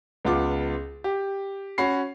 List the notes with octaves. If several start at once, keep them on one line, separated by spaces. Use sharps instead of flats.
C#2 B3 F4 D6
G4
C#4 F#4 B5 C7